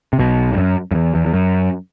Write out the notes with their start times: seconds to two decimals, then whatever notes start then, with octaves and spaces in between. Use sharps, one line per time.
0.13 C3
0.19 B1 B2
0.53 G2
0.58 F#2
0.91 F#2
0.95 E2
1.15 E2
1.26 E2
1.33 F#2